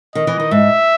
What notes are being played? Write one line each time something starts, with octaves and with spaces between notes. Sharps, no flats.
D#3 D#5
E3
D#3
G#2 E5